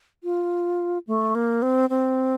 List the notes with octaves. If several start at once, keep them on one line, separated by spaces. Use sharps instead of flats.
F4
A3
A#3
C4
C4